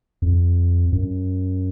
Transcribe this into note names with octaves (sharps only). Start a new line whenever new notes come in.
F2
F#2